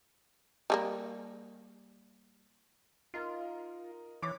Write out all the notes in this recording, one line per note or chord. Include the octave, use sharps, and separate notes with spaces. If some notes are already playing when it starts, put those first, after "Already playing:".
G3 A3 A#3
D#4 F4 A#4
E3 C#5 D6